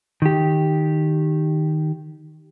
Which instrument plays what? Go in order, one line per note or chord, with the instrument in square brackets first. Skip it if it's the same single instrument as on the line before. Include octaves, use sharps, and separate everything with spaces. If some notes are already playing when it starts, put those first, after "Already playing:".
[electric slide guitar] D#3 G4